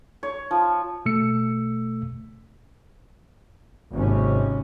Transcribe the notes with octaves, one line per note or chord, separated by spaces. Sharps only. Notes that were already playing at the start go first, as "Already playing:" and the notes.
C#5
F3
B2 A3 E6 C#7
G#1 D#2 C3 C#4